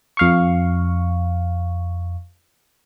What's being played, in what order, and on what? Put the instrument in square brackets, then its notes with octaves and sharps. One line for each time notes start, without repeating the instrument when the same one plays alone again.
[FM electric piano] F2 F5 C#6